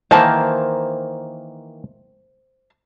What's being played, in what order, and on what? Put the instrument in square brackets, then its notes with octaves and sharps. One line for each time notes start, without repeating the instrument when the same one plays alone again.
[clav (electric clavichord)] D#3 E3 A#3 [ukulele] C5 A5